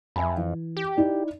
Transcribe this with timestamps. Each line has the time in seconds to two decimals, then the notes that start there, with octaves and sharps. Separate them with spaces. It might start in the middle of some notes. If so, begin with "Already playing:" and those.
0.16 F2 E5 G#5 B5
0.38 E3
0.77 G4
0.97 D#4 E4 D5